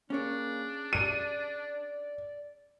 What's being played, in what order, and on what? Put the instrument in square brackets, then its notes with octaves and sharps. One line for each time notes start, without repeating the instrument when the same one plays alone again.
[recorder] A#3 [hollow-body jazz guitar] C#4 G#4 C#5 [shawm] D4
[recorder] D5 [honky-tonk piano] D#7